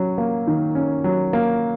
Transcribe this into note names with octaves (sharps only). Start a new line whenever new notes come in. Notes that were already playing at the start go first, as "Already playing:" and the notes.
Already playing: F#3 C#4
A#3
D#3
C#4
F#3
A#3